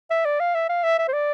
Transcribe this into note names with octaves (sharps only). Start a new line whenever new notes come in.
E5
D5
F5
E5
F5
E5
E5
C5
D5